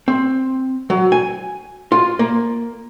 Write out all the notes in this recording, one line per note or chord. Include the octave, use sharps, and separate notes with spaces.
C4
F#3
G#5
F4
A#3